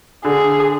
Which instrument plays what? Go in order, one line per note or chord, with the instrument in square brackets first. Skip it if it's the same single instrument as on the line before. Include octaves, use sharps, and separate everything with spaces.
[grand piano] D3 [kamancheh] G#4